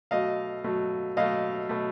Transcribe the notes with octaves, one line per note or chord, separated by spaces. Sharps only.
B2 F#3 A3 D#5 F5
B2 F#3 A3
B2 F#3 A3 D#5 F5
B2 F#3 A3